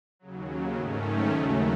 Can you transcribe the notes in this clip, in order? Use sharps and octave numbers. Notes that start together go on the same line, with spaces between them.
D#2 C#3 F#3
G#2 D#3 A3 C#4
D#2 C#3 F#3 A3